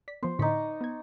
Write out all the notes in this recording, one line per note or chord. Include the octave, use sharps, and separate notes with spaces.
D5 B6
F3 B3 C5
A2 D3 D#4 D5 C#6 B6
B3 G#6